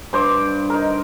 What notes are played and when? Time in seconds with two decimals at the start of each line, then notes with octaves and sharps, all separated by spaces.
0.13 G2 C5 D6
0.70 D#4 A#4